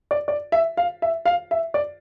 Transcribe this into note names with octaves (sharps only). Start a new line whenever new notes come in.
D5
D5
E5
F5
E5
F5
E5
D5